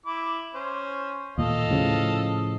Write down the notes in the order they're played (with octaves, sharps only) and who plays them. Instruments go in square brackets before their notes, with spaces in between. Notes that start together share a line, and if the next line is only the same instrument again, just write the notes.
[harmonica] E4 D6
C#4 C5
[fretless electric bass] D#2 A#2 [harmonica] A4 D#5 F5
[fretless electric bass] A2 C#3 F3